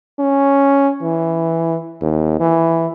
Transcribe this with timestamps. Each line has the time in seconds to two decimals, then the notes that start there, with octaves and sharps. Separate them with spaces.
0.19 C#4
1.01 E3
2.01 D#2
2.40 E3